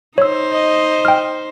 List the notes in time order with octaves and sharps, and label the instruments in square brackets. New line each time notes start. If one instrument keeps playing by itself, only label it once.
[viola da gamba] D#4 C5 [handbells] C#5 E6
[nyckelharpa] D#5
[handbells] G5 F6